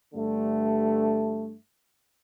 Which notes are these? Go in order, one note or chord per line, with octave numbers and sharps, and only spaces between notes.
G2 D3 G3 A3